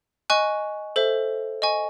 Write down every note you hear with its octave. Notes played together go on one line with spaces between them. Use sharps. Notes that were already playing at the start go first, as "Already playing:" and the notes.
D#5 G#5 C#6 F#6
A4 C5 E5
D#5 G#5 C#6